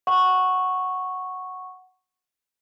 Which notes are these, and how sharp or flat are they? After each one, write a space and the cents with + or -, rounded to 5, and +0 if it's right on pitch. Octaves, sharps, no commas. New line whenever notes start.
F#5 +0 C#6 -5